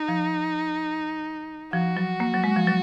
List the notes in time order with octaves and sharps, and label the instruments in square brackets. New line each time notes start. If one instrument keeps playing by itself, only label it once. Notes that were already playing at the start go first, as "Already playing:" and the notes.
Already playing: [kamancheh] D#4
[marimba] F3
[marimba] F3 [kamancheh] F#4
[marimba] F#3
A#3
F#3
G#3
F3
F#3